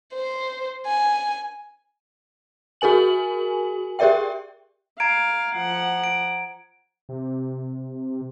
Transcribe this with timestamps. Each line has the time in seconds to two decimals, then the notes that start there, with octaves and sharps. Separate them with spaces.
0.14 C5
0.86 G#5
2.81 F#4 G#4 A#4 G#5 F#7
3.99 G4 G#4 A#4 D5 E5 G5
5.00 F5 A#5 G#6 D7
5.55 F3 F#5
6.04 D7
7.09 C3